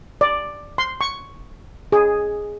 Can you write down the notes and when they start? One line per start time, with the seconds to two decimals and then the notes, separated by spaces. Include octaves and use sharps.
0.21 D5
0.78 C6
1.01 C#6
1.92 G#4